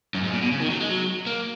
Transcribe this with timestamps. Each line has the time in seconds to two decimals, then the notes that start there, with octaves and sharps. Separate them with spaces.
0.15 F#2
0.24 G#2
0.33 A#2
0.42 B2
0.52 C#3
0.60 D#3
0.70 F#3
0.80 G#3
0.89 F#3
1.26 A#3